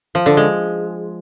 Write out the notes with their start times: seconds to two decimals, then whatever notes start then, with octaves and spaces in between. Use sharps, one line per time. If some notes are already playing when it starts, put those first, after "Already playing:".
0.15 F3
0.26 D3
0.37 G#3